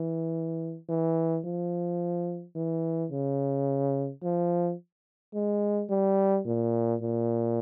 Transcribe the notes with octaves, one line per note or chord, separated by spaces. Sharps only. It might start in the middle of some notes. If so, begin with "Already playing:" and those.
Already playing: E3
E3
F3
E3
C#3
F3
G#3
G3
A#2
A#2